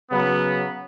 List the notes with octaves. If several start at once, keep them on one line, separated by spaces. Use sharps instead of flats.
C#3 F#3 B3